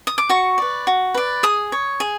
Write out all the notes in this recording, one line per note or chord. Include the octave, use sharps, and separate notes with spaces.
D#6
D6
F#4 C#6
B4 D5
F#4
B4 D5
G#4 D#6
C#5
G#4